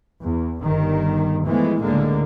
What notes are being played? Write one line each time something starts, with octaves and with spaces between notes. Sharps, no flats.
E2
G1 D#3 G3
E3 F3 G#3 A3 B3
C#2 A2 D3 G#3 A#3